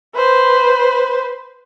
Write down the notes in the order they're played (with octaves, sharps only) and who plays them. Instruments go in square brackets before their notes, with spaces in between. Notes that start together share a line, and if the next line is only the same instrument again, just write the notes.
[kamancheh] B4 C5